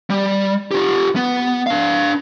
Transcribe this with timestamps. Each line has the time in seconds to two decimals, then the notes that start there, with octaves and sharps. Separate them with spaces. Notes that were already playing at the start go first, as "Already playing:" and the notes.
0.10 G3
0.71 F4 G4
1.16 B3
1.67 D4 F5